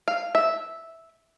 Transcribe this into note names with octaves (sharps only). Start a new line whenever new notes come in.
F5
E5